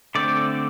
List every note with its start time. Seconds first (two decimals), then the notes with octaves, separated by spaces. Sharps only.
0.15 D3 A3 C4 D5